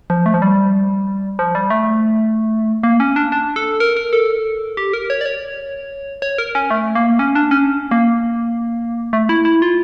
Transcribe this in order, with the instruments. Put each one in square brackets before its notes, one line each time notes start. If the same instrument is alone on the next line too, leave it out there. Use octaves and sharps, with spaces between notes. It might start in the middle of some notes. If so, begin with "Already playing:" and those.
[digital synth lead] F3
A3
F3
G3
F3
G3
A3
A#3
C#4
D4
D4
A4
A#4
A#4
A4
G4
A#4
C#5
D5
C#5
C#5
A#4
C#4
A3
A#3
C#4
D4
C#4
A#3
A3
E4
E4
F4